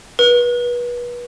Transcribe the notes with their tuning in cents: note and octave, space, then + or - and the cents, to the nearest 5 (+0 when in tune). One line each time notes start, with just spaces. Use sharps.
B4 -30